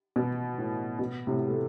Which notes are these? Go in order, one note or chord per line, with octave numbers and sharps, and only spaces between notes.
B2
A2
B2
A2 C3
A3